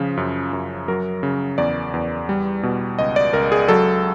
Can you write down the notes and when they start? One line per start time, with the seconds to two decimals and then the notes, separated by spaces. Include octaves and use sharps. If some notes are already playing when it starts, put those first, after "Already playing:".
Already playing: C#3 F3
0.17 F#2
0.53 F#2
0.88 F#3 A#4
1.23 C#3
1.58 E2 D5
1.94 E2
2.29 G3
2.63 B2
2.99 C#2 D#5
3.16 D5
3.33 C#2 A#4
3.52 G#4
3.68 F#3 A4